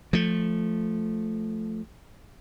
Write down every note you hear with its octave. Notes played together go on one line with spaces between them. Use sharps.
F3 A3